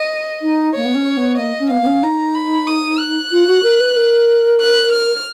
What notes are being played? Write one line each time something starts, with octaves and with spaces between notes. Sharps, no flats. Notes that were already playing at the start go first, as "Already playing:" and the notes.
Already playing: D#5
D#4
A#3 C#5
B3
C#4
B3
A#3 D#5
C#4
B3 F5
B3
C#4
D#4 A#5
B5
D#6
F#6
F4
F#4
A#4
B4
A#4
F#6
F6